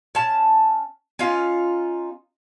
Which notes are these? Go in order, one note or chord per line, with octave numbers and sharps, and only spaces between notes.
C#4 A5
C#4 D#4 F4